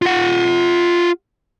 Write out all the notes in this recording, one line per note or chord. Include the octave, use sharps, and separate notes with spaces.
F4 F#5